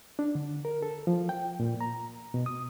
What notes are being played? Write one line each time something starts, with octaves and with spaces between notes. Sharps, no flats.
D4
D3
A#4
A4
F3
G5
A#2
A#5
B2
D#6